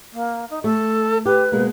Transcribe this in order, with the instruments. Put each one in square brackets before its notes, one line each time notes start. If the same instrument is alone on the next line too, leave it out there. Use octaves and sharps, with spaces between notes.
[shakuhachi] A#3
D#4
[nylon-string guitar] A3 [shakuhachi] A4
[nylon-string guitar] G4 [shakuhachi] B4
[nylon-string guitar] B2 G#3 A#3